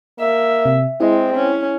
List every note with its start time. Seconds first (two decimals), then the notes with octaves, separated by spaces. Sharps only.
0.20 A#3 E5
0.65 C3
1.00 G#3 C4 E4
1.36 C#4